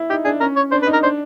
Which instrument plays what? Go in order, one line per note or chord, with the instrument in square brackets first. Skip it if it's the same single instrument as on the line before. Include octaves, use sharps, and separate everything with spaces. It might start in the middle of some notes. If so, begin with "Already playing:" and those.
Already playing: [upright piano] E4
[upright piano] D#4 [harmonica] G4
[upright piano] D4 [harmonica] G#4
[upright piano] C#4 [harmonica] A#4
[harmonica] C#5
[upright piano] D4 [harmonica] C5
[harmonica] B4
[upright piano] D#4
[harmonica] A#4
[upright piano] D4 [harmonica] C5